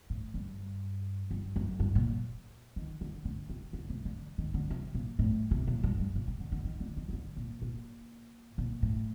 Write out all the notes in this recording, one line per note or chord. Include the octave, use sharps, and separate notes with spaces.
A2
G2
G2
F#2
G2
A#2
D#3
D3
D3
C3
D3
C3
D3
D#3
D3
C3
A#2
A2
C3
A#2
G2
G2
A#2
C3
D3
D3
D#3
D3
D#3
C3
D3
A#2
A#2
A#2
A2